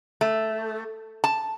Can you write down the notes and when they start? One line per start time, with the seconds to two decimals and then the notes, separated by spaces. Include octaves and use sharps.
0.21 A3
1.24 A5